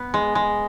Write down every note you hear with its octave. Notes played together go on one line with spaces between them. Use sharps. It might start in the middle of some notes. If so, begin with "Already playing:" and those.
Already playing: B3
G#3
G#3